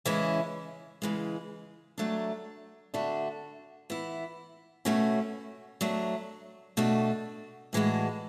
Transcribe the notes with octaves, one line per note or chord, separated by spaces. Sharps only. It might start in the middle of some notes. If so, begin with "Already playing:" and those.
C#3 E3 G#3 C#4 E4
C#3 E3 G#3
F#3 A3 D4
D3 A3 D4 F#4
E3 B3 E4
B2 A3 C#4 F#4
F#3 A3 D4
B2 A3 D4 F#4
A2 E3 G#3 D4 F#4